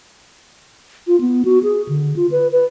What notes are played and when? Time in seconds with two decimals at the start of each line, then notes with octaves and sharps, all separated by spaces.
1.07 F4
1.21 B3
1.45 F#4
1.63 G#4
1.88 D3
2.16 F4
2.31 B4
2.52 B4